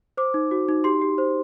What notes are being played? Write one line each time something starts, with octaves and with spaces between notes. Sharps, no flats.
C5 D6
D#4
F#4
D#4
G4 C6
G4
C5